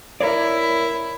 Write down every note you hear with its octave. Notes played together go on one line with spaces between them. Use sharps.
E4 A#4 C#5 D5